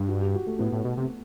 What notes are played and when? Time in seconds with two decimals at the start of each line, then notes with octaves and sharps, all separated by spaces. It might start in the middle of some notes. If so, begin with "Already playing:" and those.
Already playing: G2
0.08 F#4
0.21 G4
0.35 F#4
0.47 A3 A4
0.59 A2 B3 B4
0.72 A2
0.85 B2
0.97 C3